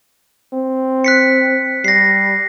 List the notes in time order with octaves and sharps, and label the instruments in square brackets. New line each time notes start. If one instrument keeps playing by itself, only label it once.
[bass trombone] C4
[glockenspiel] F#6 B6 C#7
[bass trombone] G3 [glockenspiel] A#6 C7